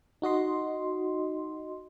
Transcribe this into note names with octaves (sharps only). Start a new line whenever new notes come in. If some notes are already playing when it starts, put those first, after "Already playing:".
D#4 F#4 D#5 C6